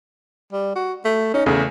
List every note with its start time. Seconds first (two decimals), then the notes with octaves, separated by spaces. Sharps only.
0.53 G3
0.76 F#4
1.05 A3
1.34 C#4 D#4
1.46 E2 C#3 A3